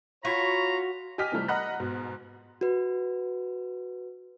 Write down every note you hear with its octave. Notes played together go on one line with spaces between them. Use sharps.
F4 F#4 C#5 A#5 B5
G4 D#5 G#5 F6 B6
C3 E3 F3 G3 A3
D#5 F#5 A#5 B5 F#6 A#6
G#2 B2
F#4 B4